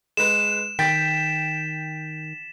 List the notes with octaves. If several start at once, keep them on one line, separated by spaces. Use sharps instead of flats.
G#3 B4 E7
D#3 G5 A6 B6